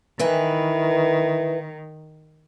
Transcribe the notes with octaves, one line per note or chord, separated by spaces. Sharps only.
D#3 E3 E4 B4